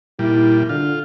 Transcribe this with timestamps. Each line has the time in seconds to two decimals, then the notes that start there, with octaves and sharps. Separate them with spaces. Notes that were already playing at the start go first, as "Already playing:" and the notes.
0.19 A#2 G3 E4
0.69 D3 F4